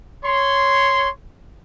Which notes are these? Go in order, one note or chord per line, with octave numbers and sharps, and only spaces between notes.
C#5 C6